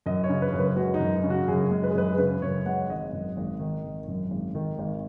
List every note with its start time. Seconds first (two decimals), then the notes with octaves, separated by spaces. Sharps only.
0.06 F#2 D#5
0.24 C#5
0.29 C#3
0.42 B4
0.53 F#2
0.59 B4
0.76 G#3 F#4
0.94 D#4
1.00 F#2
1.24 C#3
1.30 F#4
1.48 F#2 G#4
1.71 G#3
1.83 B4
1.90 G#4
1.95 F#2 B4
2.12 G#4
2.18 C#3 B4
2.42 F#2 C#5
2.66 G#3 F#5
2.89 G#1 D#5
3.13 F#2
3.37 G#1
3.60 D#3
3.84 G#1
4.08 F#2
4.31 G#1
4.55 D#3
4.79 G#1